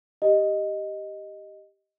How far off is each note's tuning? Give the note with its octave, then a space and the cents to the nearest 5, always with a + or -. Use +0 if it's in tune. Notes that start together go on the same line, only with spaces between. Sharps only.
G4 +0 D#5 +0